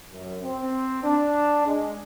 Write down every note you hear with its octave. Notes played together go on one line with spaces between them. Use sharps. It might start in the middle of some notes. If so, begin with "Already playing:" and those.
F#2
C4
D4
G#3